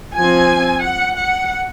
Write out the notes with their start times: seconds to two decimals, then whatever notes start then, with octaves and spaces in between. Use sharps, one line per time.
0.16 F3 C4 G#5
0.84 F#5
1.19 F#5